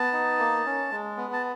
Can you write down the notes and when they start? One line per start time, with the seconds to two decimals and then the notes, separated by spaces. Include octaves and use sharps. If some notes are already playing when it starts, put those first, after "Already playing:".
Already playing: B3 A5
0.13 D#4
0.39 A#3
0.65 C#4
0.91 G#3
1.17 B3
1.33 A5